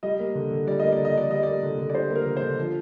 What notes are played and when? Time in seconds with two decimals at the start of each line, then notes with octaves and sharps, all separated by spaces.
0.03 G3 D#5
0.19 A#3
0.35 D3
0.51 D3
0.67 G3 D5
0.80 A#3 D#5
0.92 D5
0.99 D3
1.05 D#5
1.15 D3 D5
1.31 G3 D#5
1.43 A#3 D5
1.63 D3
1.78 D3
1.89 D5
1.95 G3 C5
2.10 A#3
2.15 A#4
2.26 D3
2.37 C5
2.42 D3
2.58 F3